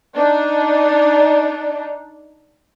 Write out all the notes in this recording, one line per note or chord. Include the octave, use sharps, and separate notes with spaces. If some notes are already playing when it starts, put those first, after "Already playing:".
D4 D#4